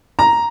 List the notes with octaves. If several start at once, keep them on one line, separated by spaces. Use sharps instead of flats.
A#5